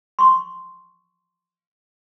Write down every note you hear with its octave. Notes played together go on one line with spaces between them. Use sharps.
C6 C#6